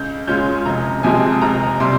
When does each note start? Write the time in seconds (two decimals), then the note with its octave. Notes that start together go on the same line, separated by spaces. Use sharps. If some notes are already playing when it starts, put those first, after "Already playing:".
Already playing: C#2 G6
0.27 C#3 G#3 C#4 F4 G6
0.65 F1 A#5
1.03 F2 C3 F3 G#3 G#5
1.41 F1 A#5
1.80 C3 G3 C6